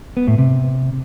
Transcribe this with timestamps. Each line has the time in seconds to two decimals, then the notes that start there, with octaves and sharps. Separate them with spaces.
0.17 B3
0.27 A2
0.38 C3